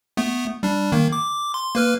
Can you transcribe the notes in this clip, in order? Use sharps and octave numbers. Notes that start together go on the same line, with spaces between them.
A3 B3
G3 D4
D#3 A#3
D6
C6
A#3 B4 F6